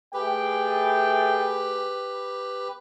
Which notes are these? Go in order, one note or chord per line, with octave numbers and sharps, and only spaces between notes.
A3 G4 G#4 B4 G5